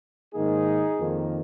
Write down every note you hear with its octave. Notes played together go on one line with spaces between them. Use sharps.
G#2 D#3 A#3 D#4 G#4
F2 D#3 A#3